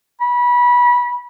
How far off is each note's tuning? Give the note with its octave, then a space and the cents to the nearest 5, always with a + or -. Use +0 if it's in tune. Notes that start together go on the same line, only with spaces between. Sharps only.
B5 -25